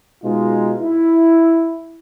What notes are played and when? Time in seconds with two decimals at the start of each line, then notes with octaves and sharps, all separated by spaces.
0.24 B2 G#3 D#4 F4
0.81 E4